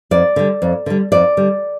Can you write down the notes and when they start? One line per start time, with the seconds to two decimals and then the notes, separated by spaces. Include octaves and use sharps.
0.11 F2 D5
0.36 D3 G3
0.62 F2
0.86 D3 G3
1.12 F2 D5
1.37 D3 G3